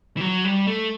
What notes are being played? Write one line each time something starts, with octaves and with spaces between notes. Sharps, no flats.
E3
F#3
G3
A3